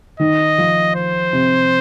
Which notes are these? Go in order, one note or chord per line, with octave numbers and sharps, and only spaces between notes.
D#3 D#5
F3
C5
C3